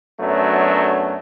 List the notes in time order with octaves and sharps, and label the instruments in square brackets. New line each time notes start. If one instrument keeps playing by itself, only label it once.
[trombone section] F#2 F#3 A3 B3 D4